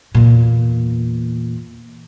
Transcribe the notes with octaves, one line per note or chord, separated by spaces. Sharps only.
E2 A#2